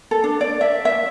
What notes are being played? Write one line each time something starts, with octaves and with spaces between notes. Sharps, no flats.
A4
D4
D5
E5
E5